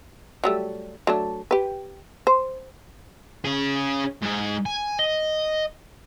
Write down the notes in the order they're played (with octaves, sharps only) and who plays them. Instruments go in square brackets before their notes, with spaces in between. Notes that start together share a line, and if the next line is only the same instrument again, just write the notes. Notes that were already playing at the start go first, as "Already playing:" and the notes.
[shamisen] F#3 G3 A3
F#3 A3 D4
G4 B4
C5
[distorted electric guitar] C#4 G#4
G#2 G#4
G#5
D#5